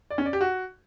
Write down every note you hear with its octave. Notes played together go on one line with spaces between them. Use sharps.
D5
C#4
D5
G4
F#4